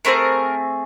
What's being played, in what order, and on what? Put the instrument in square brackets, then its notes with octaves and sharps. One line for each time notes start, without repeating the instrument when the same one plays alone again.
[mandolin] A3 C4 G#4 A#4